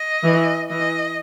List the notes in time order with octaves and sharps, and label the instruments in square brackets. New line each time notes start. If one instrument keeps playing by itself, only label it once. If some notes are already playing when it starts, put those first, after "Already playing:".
Already playing: [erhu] D#5
[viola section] E3
[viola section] E3 [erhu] D#5